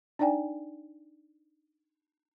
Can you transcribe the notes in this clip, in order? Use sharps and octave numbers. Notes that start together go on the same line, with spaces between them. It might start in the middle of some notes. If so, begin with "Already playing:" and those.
D4 D#4 D5 G5 G#5